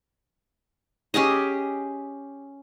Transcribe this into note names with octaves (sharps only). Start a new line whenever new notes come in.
C#4 G4 G#4 D#5